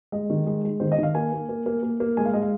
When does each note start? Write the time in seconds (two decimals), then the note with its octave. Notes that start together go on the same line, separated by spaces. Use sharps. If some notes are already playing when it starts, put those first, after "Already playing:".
0.12 G#3 D#5
0.30 D#3
0.47 G#3
0.64 G#3
0.80 D#3 C5
0.92 D#5
0.98 D#3
1.03 F5
1.15 A#3 G#5
1.32 A#3
1.49 A#3
1.66 A#3
1.83 A#3
2.00 A#3
2.17 G#3 G#5
2.25 F5
2.33 G#3 D#5
2.42 F5